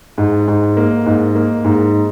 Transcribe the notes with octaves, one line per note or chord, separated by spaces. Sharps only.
G#2
G#2
A#3
G#2
A#3
G#2